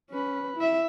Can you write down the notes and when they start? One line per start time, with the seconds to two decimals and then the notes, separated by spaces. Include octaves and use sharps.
0.11 C#4 B4
0.57 E4 E5